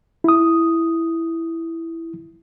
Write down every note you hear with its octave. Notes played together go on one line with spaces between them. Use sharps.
E4 D#6